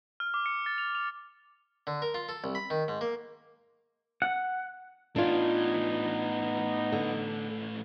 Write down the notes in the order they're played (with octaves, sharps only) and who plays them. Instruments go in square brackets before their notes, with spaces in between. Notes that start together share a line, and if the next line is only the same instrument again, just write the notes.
[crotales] F6
D6
C#7
A6
F7
F7
[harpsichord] D3
A#4
F4
A4
C2
B5
D#3
G#2
A#3
[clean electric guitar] F#5
[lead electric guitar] A2 E3 [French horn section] B3 D#4 [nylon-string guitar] D4 F4
[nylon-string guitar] D3